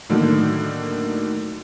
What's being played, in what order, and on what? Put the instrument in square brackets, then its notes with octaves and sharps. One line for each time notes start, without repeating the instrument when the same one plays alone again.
[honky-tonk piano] A2 D3 D#3 F#3 A#3